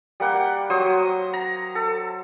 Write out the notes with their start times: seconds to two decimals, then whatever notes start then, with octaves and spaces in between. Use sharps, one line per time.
0.20 G3 A#3 F#5 G5
0.70 F#3 C5 D#6
1.33 A#5
1.75 A4